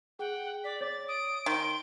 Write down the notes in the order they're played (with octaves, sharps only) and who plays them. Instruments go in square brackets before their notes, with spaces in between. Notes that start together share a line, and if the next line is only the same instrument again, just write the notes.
[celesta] G#4 [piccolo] F#5 [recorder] G5
[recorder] D5 [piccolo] B6
[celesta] C#5 D6 [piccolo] A6
[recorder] D#6 [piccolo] D7
[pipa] D#3 [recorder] C6